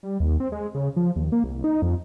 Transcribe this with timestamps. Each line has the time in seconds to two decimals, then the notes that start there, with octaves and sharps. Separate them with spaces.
0.03 G3
0.20 D#2
0.40 C4
0.52 G#3
0.75 C#3
0.96 F3
1.16 D#2
1.32 A#3
1.44 C2
1.64 D#4
1.82 F2